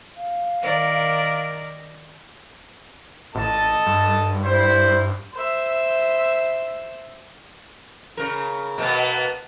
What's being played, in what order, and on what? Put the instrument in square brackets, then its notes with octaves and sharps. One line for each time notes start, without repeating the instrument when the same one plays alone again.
[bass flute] F5
[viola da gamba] D#3 A#4 D5
[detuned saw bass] A1 [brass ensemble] A4 D#5 A5
[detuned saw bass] G2
[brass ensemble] G3 E4 C5
[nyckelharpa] C5 E5
[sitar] C#3 A#4
B2 A#3 B3